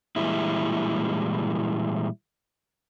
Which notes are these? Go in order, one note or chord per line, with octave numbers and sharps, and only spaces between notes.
A#2 E3 G3 G#3 E4